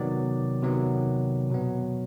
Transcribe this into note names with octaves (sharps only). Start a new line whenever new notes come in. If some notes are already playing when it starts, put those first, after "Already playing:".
Already playing: C3 D#3 F#3 B3 D5
C3 D#3 F#3 B3
B2 F#3 B3